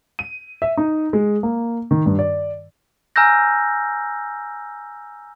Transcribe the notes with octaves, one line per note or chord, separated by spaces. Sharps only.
D#7
E5
D#4
G#3
A#3
D#3
G2
D5
G#5 A#5 E6 F6 G6 A#6